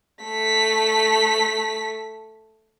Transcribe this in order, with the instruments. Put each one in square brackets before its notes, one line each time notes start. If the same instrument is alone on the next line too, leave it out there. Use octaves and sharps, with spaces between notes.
[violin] A3 B6